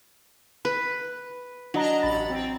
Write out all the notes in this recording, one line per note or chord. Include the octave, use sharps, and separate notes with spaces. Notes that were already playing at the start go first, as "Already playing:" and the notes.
B4
F#3 D4 D#5 A#5
A1 B5 A6
C4